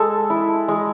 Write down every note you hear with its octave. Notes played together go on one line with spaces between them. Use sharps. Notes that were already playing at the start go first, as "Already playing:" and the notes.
Already playing: G#3 A4
E4
G#3